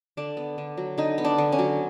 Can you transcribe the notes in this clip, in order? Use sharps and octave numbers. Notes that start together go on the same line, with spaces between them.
D3 D4
B3
D3
F#3
D3 D#4
B3
D4
D3
C#4
F#3